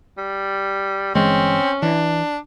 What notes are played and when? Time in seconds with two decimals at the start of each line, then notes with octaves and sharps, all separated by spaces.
0.18 G3
1.15 G1 E3 G#3 C4 C#4
1.82 E3 D4